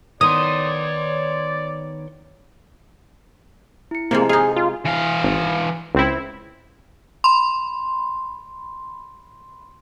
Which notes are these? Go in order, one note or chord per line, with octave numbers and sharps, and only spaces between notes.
D#3 B3 C#5 D5 C6 D#6
E4 C#7
C3 F3 G#3 A#3 A#5
D#4 G#4 D#5 F5
F4
E3 F5
G#1
C#2 C4 E4
B5 C6